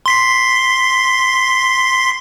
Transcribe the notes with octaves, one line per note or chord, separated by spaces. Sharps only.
C6 B6 C7